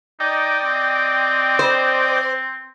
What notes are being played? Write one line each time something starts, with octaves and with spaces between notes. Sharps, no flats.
D#4 D5 D#5 G5
C4
C5